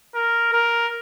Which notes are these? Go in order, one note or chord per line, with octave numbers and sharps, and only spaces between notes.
A#4
A#4